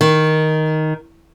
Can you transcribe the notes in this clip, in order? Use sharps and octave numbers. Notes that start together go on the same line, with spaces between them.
D#3